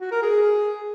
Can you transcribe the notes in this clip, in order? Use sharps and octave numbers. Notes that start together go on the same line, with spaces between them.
F#4
A#4
G#4